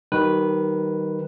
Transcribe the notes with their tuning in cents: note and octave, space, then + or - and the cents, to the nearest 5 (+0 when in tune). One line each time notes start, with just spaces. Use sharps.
D#3 +0 G3 -45 B4 -5